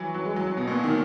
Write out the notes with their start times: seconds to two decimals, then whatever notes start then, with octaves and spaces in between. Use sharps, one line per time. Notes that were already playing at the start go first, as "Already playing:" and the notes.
Already playing: E3 F#3
0.14 F#3
0.25 G#3
0.36 F#3
0.47 F#3
0.57 B2
0.68 A#2
0.84 D#3